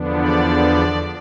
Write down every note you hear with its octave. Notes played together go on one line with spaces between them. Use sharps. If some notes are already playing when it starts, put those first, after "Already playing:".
Already playing: E2 D3 F3 B3 D4
D5